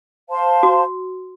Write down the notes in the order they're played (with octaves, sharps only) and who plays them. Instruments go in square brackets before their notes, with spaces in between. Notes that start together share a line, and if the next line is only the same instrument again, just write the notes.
[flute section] C5 F5 A5 C6
[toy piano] F#4